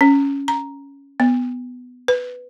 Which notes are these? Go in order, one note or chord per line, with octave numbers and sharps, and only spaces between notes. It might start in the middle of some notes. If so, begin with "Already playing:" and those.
C#4
A#5
B3
B4